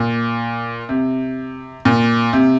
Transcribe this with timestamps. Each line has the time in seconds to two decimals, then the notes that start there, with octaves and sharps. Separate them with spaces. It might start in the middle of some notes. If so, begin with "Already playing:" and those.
Already playing: A#2
0.89 C3
1.85 A#2
2.33 C3